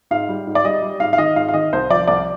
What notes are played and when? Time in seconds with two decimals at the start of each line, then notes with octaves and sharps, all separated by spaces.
0.11 G#2 F5
0.29 G3
0.47 G#2
0.55 D5
0.64 G3 D#5
0.82 G3
1.00 G#2 F5
1.13 F5
1.18 D#3 D#5
1.36 G#2 F5
1.48 F5
1.54 D#3 D#5
1.73 C2 C5
1.90 F3 D5
2.08 C2 D5